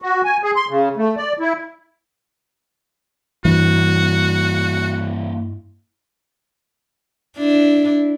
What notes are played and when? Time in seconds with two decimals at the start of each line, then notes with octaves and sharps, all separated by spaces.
0.02 F#4
0.25 G#5
0.43 G#4
0.56 C6
0.69 C#3
0.97 A3
1.17 D5
1.40 E4
3.45 G2 E3 G3 A#3 E4 F#4
7.38 D4 E4